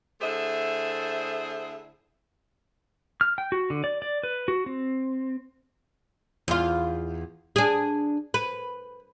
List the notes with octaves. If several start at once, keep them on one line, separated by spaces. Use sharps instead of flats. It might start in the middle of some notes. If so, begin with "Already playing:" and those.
D3 A3 E4 G#4 C5 E5
F6
G5
F#4
D3
D5
D5
B4
F#4
C4
E2 F4
D4 G#4
B4